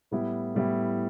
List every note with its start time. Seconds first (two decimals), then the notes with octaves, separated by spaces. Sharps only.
0.11 A2 G3 B3 E4
0.55 A2 G3 B3 E4